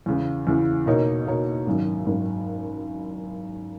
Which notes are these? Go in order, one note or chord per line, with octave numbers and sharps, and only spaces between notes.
E2 C#3 E3
E2 C#3 E3
B2 A#3 D#4 A#4 C#5
B2 A#3 D#4 A#4 C#5
G#1 F#2 D#3
G#1 F#2 D#3